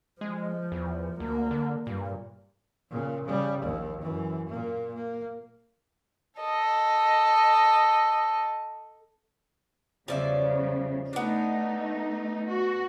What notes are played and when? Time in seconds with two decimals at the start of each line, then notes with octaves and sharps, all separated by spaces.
0.21 F3 G#3
0.72 E2
1.20 D2 A#3
1.51 D3
1.87 G2 A#2
2.90 A#2 C#3
3.25 C#3 G3
3.62 A#1 D#2
4.02 F#2 E3
4.49 A#2 A#3
4.94 A#3
6.41 A4 D#5
10.08 E2 C#3 F3 G3 D5 E5
11.13 A3 B3 D4 D#4
12.49 F#4